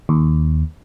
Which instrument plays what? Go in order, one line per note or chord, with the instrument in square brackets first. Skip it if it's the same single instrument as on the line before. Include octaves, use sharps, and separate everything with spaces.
[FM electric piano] D#2